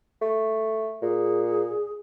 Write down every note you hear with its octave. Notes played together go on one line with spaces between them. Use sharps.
A3
A#2 G#4